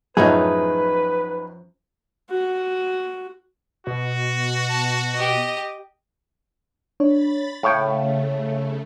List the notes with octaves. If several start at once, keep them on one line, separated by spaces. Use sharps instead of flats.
F#2 A2 F3 C#4 D#4 E4 G#4 B4
F#4
B2 F#4
A5
G4 D#5
D4 C#5 B5 A6
A2 C#3 A3 C#5 F5 G5